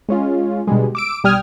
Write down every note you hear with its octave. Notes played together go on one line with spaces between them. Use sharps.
G#3 C#4 F4
B2 D3 G3 G#3
D6 E6 D7
B1 G3 G5 D#6 F6 G#6